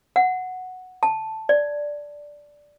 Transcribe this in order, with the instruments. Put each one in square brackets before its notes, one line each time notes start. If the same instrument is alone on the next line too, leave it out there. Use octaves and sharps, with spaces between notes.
[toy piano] F#5
A5
D5